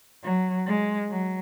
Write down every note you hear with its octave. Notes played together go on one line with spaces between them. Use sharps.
F#3
G#3
F#3